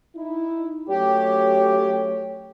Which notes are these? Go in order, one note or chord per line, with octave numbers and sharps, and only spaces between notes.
D#4 E4
F#2 A3 G4 C#5